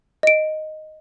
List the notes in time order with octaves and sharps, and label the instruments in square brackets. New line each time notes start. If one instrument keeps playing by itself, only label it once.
[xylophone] D#5 D7